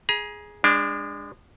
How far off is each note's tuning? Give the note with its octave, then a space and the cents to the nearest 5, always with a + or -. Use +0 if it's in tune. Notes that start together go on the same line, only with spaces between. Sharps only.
G#4 +0 A#5 +40
G#3 -30 D4 +0